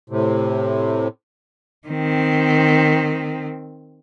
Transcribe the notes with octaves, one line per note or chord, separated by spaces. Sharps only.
A2 C3
D#3 C4